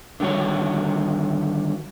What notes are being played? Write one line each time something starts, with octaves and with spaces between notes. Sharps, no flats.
D3 D#3 G3 F#4 C#5